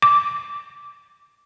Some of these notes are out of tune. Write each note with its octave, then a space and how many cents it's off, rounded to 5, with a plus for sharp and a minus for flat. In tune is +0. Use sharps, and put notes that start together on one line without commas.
D6 -10